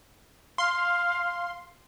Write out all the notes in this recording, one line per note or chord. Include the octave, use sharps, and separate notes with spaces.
F5 C6